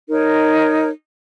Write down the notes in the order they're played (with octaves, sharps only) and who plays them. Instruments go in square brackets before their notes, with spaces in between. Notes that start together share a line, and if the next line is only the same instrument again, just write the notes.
[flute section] D#4 A#4 C#5